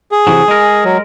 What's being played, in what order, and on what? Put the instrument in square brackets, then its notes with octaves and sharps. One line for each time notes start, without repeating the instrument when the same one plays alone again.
[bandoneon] G#4
[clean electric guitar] C3 E3 F#3
G#3 A#4
[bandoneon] F#3